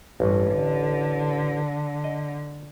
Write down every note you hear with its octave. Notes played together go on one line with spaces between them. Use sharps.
A1 G2
D3
D#5